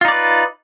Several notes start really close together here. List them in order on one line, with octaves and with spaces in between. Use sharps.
F4 D#4 D5 B4